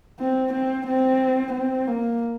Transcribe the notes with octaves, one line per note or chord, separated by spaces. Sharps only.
C4
C4
C4
C4
A#3